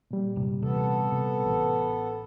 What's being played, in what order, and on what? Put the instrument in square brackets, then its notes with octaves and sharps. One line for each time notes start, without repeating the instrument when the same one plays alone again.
[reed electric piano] A#2 G3
[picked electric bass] D#1 G2 C3
[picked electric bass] C3 E3 D4 [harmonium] B3 A4
[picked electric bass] C3
A1 A2